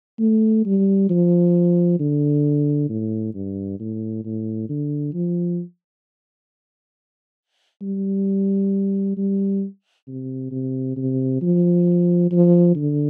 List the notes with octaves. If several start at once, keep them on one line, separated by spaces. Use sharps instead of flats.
A3
G3
F3
D3
A2
G2
A2
A2
D3
F3
G3
G3
C3
C3
C3
F3
F3
D3